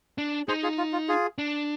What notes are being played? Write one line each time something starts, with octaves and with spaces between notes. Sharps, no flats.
D4
D#4 G#4 C5
F4 G#4
F4
F4
F4 G#4
D4